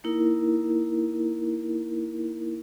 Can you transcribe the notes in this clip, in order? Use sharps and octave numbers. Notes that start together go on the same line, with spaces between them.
A#3 D#4 E4 A#4